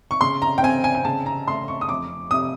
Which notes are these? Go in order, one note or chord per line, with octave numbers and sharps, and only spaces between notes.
C#6
C#3 C6
A#5
G5
C4 G#5
G#5
G#5
C#3 A5
A#5
A3 C6
C#6
D#6
F2 D6
C3 D#6